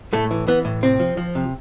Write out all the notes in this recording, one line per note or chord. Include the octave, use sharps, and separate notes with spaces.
A2 A3
E3
E3 B3
A2
C3 C4
F3
F3
C3